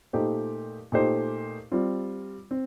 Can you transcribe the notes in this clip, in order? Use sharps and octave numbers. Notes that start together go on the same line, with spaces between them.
A#2 A3 D#4 G4 C5
A#2 A3 D#4 G4 C5
G3 C4 F4
C4